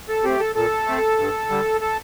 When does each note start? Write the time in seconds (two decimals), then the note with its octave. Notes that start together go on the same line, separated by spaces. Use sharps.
0.08 A4
0.24 A3 C4 G4
0.40 A4
0.55 A#2 A4
0.87 A3 C4
1.18 G2
1.49 D3 G3
1.81 A4